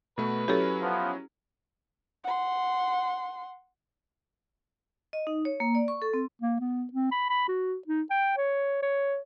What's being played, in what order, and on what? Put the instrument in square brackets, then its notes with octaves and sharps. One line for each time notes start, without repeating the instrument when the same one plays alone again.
[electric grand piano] B2 A3 F#4 [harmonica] B4
[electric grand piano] F#3 C#4 E4 [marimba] G4 A4
[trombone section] F3 B3
[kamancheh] F#5 C6
[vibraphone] D#5
D#4
C#5
A#3
D5
C#6
A4
C4
[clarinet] A#3
B3
C4
B5
B5
F#4
D#4
G5
C#5
C#5